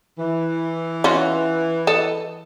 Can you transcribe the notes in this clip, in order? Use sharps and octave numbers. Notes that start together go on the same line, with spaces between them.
E3
C#4 F4 F#4
A4 D#5